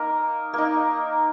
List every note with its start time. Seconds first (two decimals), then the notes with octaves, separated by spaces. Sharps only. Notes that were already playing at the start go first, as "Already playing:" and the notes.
Already playing: A#3 D#4 A#4
0.53 A#3 D#4